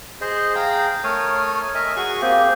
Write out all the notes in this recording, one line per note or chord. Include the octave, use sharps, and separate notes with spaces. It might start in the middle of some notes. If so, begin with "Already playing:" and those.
G#4 C5 D#5
G#4 F5 G5 A#5
A3 A#4 C#5 D#6
A#4 D#5 E5 G#5
F#4 G#4 G#5 C#6
A#3 C4 G4 G#4